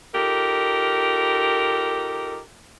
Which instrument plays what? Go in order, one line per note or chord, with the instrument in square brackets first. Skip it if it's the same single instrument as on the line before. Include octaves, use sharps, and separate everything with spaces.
[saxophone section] D#4 F4 G4 A4 A#4